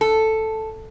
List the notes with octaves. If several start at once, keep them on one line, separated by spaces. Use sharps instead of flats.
A4